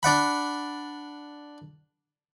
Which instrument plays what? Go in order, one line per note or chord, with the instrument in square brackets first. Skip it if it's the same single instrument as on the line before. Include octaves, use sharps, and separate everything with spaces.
[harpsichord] D4 D5 F#5 B5